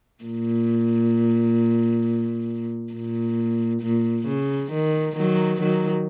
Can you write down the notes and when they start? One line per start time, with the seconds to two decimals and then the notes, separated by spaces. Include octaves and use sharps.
0.24 A#2
2.92 A#2
3.82 A#2
4.27 C#3
4.72 D#3
5.16 D#3 F#3
5.61 D#3 F#3